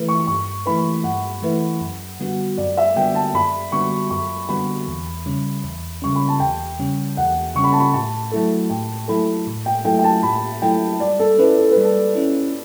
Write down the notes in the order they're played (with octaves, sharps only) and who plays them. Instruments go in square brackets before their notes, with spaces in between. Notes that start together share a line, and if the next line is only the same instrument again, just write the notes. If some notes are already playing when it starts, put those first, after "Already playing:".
Already playing: [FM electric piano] E3 A3 E4 B4
[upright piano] C#6
[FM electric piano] G2 [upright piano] C#6
[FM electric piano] E3 A3 E4 B4 [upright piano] B5
[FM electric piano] G2 [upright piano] F#5
[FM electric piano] E3 A3 E4 B4
F#2
D3 G3 B3 F#4
[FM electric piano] F#2 [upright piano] D5
[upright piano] E5
[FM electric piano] D3 G3 B3 F#4 [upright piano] G5
[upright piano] A5
[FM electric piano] F#2 [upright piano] B5
[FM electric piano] D3 G3 B3 F#4 [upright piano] C#6
[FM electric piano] F#2 [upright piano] C#6
[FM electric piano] D3 G3 B3 F#4 [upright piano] B5
[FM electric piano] E2
C#3 G3 C#4
E2
[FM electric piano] C#3 G3 C#4 [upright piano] C#6
[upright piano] B5
A5
[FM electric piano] E2 [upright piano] G5
[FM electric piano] C#3 G3 C#4
[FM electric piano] E2 [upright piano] F#5
[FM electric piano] C#3 G3 C#4 [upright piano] C#6
[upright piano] B5
A5
B5
[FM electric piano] A2 [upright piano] A5
[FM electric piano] F#3 A3 E4 A4
[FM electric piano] A2 [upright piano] G5
[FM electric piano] F#3 A3 E4 A4 [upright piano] B5
[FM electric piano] A2
[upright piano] G5
[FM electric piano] F#3 A3 E4 A4 [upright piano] G5
[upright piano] G5
A5
[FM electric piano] A2 [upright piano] B5
[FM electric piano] F#3 A3 E4 A4 [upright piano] G5
[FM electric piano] G3 [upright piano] D5
[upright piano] A4
[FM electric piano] C#4 E4 [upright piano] B4
[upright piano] A4
B4
[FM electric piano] G3
[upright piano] A4
[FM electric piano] C#4 E4